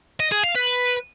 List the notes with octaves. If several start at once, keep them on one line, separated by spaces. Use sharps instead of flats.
D#5
G#4
F5
B4